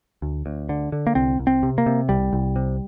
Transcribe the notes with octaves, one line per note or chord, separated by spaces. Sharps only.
D2
D2
D3
D3
A#3
C2 C4
C2
C4
C3
A#3
C3
C2 G3
C2
C3